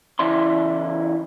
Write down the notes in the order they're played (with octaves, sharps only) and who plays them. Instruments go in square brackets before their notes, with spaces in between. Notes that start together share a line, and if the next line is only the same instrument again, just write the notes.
[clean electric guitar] C#3 E3 E4 D5 C6